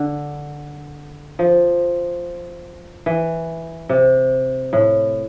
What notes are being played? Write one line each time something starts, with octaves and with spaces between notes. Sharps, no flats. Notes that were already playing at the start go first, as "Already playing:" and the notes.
Already playing: D3
F3
E3
C3
A2